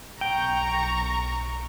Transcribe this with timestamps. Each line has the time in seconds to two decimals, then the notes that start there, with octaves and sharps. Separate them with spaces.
0.21 B1 G5 A#5 C#6